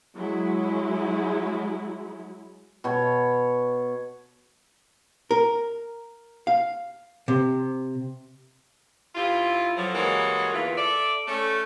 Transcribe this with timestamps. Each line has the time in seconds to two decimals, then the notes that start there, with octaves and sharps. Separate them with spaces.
0.15 F#3 G#3 E4
2.84 B2 C#5
5.31 A#4
6.47 F5
7.28 C3
9.15 G2 G3 E4 F4
9.77 D3 F3 F#3
9.95 G2 E3 G#3 A#3 F#4 C#5
10.53 E2 D3 E3 A#3 F4
10.76 A4 D5 E5
11.28 A3 C#4 A4